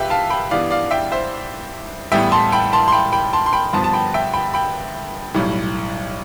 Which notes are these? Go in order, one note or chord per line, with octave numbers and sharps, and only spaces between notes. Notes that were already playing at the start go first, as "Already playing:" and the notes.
Already playing: C2 F4 G4 B4 E5 G5
F5 A5
G5 B5
G2 E3 G3 B3 D4 D5 F5
D5 F5
E5 G5
C5 E5
A1 A2 E3 G3 B3 E5 G5
A5 C6
G5 B5
A5 C6
C6
G5 B5
G5 B5
A5 C6
C6
G5 B5
G1 G2 F3 B3 A5 C6
A5
G5 B5
E5 G5
G5 B5
G5 B5
B1 A2 G3